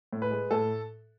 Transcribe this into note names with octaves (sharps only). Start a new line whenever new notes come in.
A2
B4
G#3
A2 A4